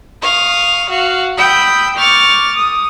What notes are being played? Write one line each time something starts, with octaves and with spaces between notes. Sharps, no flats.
F5 C#6 D#6
F#4 F5
G5 B5 D#6 E6 G6
C#6 D6 F6 A6
D#6